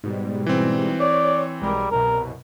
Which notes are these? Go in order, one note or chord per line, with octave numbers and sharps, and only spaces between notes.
G#2 B2 G3
E3 C4
C#5 D5
B1 G3 G#3 A#4
C2 F#2 B2 A#4